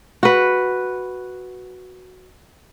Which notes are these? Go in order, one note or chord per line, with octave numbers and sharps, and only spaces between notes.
F#4 B4